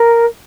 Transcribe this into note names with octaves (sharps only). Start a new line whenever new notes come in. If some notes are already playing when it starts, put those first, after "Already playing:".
Already playing: A#4